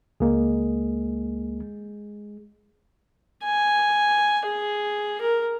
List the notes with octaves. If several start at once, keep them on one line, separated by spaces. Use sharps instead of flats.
C#2 G#3 A#3 G#4
G#5
G#4
A#4